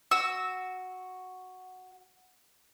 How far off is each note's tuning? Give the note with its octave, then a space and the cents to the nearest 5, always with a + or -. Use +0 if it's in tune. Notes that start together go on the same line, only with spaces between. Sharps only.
F#4 +0 E6 -10